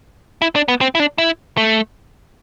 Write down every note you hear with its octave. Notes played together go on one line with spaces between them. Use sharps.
E4
D4
B3
C4
E4
D4
E4
A3